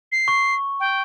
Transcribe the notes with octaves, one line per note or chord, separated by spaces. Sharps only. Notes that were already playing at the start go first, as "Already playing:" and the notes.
C7
C#6
G5